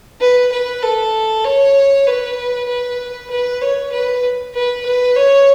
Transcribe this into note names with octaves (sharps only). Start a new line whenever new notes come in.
B4
B4
A4
C#5
B4
B4
B4
C#5
B4
B4
B4
C#5